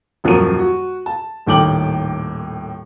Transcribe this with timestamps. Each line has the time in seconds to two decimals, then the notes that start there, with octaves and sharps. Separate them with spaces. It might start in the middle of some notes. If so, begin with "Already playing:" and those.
0.24 D#1 F#2 F3 F#4 A#4 D#7
0.59 F#4
1.06 A5
1.46 D#1 A2 D#3 G5 D6 F#7